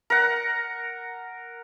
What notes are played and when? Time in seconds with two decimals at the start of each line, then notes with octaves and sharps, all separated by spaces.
0.10 A#4 F#5